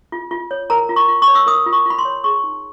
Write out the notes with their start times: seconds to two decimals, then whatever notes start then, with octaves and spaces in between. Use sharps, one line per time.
0.12 F4
0.31 F4
0.51 C#5
0.70 A#4 A#5
0.89 F4
0.96 C#6
1.08 F4
1.22 C#6
1.28 C#5
1.35 E6
1.47 A#4 D#6
1.66 F4
1.72 C#6
1.86 F4 B5
1.98 C6
2.05 C#5
2.24 G#4 C#6
2.44 D#4